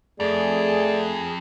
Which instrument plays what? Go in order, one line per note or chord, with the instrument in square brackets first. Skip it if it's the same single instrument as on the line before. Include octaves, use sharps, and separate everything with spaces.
[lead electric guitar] F2 [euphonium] A3 [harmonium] G#4 [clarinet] D5